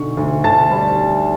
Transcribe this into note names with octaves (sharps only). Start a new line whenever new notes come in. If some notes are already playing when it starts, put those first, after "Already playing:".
Already playing: B1 D3 C#6
D2
D2 A5 A6
G3